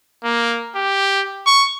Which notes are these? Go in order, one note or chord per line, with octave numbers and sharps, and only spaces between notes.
A#3
G4
C#6